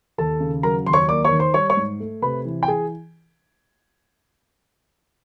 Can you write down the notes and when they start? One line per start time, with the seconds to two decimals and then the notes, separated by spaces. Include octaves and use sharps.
0.18 D#2 A4 A5
0.40 C#3
0.63 F#3 A#4 A#5
0.86 D#2 C6
0.93 C#5 C#6
1.08 A#3 D5 D6
1.25 C#5 C#6
1.32 D#3
1.39 C5 C6
1.54 G3 C#5 C#6
1.70 C#5 C#6
1.77 G#2
2.00 A3
2.22 C3 B4 B5
2.45 E3
2.63 G5
2.68 G#4 G#5